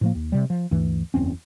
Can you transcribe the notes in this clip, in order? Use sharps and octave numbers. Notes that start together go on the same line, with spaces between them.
A2 F3 A#3
D#2
C3 G3
F3
D2 G2 E3
F#1 E2 C4 C#4